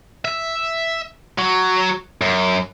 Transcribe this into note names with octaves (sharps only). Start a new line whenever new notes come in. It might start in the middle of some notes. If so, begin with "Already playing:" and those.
E5
F#3
F#2